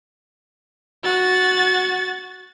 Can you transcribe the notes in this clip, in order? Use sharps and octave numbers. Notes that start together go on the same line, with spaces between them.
F#4 A6